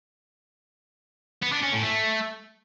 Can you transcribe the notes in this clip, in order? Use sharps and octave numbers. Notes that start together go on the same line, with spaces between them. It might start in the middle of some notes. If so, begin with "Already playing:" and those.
B3
D4
C#4
A2
A3